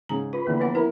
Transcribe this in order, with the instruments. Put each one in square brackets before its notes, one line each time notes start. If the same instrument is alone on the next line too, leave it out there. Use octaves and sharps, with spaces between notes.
[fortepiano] G#2 C#3 G#4 [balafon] A#5
[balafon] F4 [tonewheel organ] B4
[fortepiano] E2 D3 [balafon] A#3
[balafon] F3 B3 F#5
[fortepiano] E4 A#5 [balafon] A#4